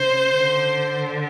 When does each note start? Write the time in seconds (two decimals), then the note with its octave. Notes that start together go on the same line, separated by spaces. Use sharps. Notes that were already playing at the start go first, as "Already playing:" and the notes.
Already playing: C#3 C5
0.32 D3